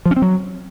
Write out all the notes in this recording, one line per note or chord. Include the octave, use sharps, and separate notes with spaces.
F3
C#4
C4
F#3